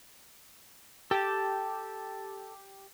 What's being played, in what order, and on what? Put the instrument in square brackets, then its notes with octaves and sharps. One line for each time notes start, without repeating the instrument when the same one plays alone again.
[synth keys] G4 [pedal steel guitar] A4 A5